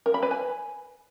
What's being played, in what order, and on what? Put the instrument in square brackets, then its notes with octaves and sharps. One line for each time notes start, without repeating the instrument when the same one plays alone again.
[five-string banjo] A#4
B5
B4
G#5